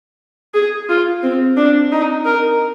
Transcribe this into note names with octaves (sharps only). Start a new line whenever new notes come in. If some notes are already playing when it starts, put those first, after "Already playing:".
G#4
F4
C4
D4
D#4
A#4